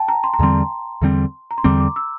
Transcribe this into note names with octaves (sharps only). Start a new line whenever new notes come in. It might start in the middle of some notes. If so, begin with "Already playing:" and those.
Already playing: G5 A5
A#5
C6
A#5
E2 D3 G3 C4 C6
E2 D3 G3 C4
A#5
C6
E2 D3 G3 C4 D6
D6
E6